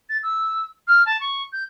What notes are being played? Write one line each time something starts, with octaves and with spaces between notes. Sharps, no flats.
A6
E6
F6
A5
C#6
G6